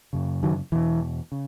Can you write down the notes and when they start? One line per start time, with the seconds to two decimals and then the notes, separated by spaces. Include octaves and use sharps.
0.13 F#2 C#3
0.43 D#3 F#3
0.72 E2 B2 E3
1.32 C#3